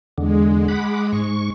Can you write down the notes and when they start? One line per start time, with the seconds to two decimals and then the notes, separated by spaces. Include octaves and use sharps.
0.18 E2 D3 G#3
0.68 F#5 B5 D6
1.12 G#2 C#6